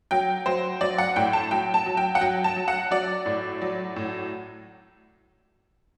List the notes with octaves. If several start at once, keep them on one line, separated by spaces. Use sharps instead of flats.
F#3 G5
F#3 C5
F#3 D5
F#5
A2 G5
A5
F#3 G5
A5
F#3
G5
F#5
F#3 G5
A5
F#3
F#5
F#3 D5
A2
F#3
A2